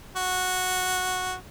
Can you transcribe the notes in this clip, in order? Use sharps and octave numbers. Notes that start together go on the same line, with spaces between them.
F#4